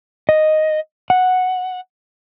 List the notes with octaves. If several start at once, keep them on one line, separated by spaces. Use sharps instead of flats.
D#5
F#5